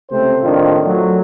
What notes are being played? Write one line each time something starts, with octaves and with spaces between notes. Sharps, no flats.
C#2 C3 A3 C4 C5
A2 D#3 A3 C4 D4 F4
F#3 A3